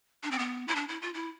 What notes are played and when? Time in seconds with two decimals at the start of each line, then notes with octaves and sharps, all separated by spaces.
0.23 D4
0.31 C4
0.39 B3
0.68 E4
0.75 D4
0.89 E4
1.02 F4
1.14 E4